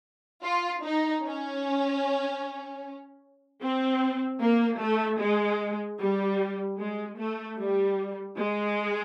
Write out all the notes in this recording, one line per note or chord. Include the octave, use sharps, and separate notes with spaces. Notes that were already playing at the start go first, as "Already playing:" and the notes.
F4
D#4
C#4
C4
A#3
A3
G#3
G3
G#3
A3
G3
G#3